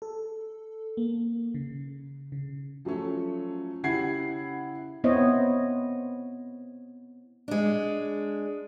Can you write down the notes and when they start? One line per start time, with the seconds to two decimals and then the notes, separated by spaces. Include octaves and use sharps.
0.02 A4
0.97 A#3
1.54 C#3
2.32 C#3
2.85 F3 F#3 A3 C#4
3.83 C#3 E4 G4 F#5 G#6 C7
5.04 B3 C4 E4 C5 C#5 D#5
7.48 G#3 D4